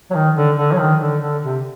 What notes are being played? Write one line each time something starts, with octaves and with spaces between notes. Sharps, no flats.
F#3
D#3
D3
D3
F#3
D#3
D3
D3
C3